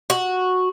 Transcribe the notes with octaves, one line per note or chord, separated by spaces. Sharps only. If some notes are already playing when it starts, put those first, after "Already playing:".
F#4